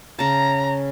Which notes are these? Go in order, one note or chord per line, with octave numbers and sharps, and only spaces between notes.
C#3 A5 A#5